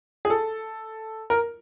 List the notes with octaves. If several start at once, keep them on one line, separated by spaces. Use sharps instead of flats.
G#4
A4
A#4